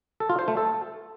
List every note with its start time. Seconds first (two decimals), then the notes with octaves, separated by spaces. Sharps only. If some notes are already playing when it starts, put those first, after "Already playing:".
0.20 A4
0.30 F4
0.39 C5
0.48 A3
0.57 A4